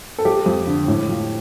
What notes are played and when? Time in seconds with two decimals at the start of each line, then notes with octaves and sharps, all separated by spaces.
0.18 A4
0.25 F3 G4
0.46 F2
0.67 D3
0.88 A2
1.09 F3